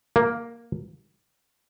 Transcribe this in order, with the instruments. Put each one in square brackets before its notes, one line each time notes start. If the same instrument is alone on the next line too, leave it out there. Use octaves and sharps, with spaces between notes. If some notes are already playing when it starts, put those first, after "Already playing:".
[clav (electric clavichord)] A#3